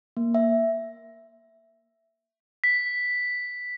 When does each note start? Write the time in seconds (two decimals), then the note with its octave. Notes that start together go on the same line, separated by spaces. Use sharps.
0.17 A#3
0.35 E5
2.64 B6